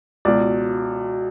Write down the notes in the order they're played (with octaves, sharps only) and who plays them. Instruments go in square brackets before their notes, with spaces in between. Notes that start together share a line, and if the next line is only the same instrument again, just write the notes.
[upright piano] C#2 B2 D5